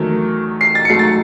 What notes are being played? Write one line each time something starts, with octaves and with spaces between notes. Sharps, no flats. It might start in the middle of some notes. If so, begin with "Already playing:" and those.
Already playing: E2 D#3 F#3 A3
C7
A6
C#7
G#2 F#3 A3 C7
A6